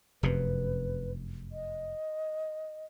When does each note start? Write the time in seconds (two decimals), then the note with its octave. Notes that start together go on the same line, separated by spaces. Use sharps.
0.23 F1 F#2 C3 B4
1.52 D#5